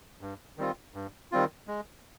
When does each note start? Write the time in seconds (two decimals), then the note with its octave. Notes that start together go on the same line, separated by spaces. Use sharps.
0.21 G2
0.58 D#3 G3 C4 F4
0.94 G2
1.32 D#3 G3 C4 F4
1.68 G#3